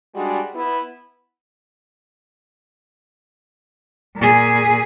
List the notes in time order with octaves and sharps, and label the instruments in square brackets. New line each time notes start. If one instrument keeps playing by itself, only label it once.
[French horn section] G3 G#3 D4 F#4
B3 E4
[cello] A#2 G#4